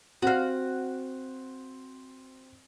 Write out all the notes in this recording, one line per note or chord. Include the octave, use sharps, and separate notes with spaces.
C4 F#4 F5